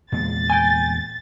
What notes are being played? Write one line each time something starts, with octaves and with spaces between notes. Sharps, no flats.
E2 A#2 G#3 A6
G5 G#5